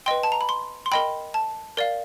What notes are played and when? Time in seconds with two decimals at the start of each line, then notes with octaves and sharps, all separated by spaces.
0.06 B4 D#5 G5 C6
0.23 A5
0.32 A#5
0.41 B5
0.49 C6
0.86 C6
0.92 A#4 D#5 G5 B5
1.34 A5
1.77 A#4 D5 F5